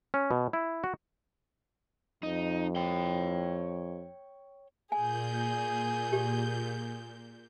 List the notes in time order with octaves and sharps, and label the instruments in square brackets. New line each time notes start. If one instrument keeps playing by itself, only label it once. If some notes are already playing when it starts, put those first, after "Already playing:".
[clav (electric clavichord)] C#4
B2
E4
F#4
[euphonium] F2 [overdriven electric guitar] D#4
[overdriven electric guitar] C#5 G5
[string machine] A#2 G6 [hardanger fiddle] G#4 [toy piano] G#5
[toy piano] G4